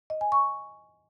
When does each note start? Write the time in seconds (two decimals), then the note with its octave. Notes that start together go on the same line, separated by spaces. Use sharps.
0.10 D#5
0.21 G#5
0.32 C#6